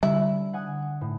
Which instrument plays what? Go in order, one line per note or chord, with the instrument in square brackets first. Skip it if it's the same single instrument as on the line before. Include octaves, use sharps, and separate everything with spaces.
[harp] D3 [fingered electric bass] G3 [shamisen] E4
[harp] F#5 G#5 D#6
A2